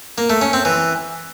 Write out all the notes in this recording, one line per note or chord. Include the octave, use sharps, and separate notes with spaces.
A#3
A3
C#4
C4
E3